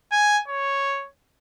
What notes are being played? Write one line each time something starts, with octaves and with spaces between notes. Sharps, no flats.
G#5
C#5